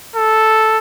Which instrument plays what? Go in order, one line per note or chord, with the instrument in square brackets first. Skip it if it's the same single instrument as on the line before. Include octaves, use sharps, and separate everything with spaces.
[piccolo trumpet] A4